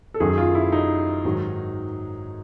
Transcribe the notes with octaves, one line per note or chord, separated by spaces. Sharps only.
A4
F#2 D#3 F#3 G#4
F4
E4
D#4
G#2 D#3 F#3